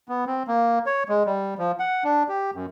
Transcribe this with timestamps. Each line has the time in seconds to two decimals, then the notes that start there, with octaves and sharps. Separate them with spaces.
0.09 B3
0.26 C4
0.47 A#3
0.86 C#5
1.09 G#3
1.26 G3
1.58 F3
1.79 F#5
2.04 D4
2.29 G4
2.54 F#2